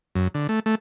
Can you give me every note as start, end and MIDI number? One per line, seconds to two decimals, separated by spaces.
0.15 0.28 42
0.35 0.47 50
0.49 0.60 57
0.66 0.75 57